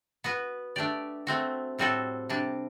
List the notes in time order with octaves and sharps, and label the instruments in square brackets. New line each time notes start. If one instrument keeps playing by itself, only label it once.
[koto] B3 F#4 B4
A3 D4 G4 D5
A3 C4 F#4
A2 G3 C4 F#4 A4
C3 G3 D4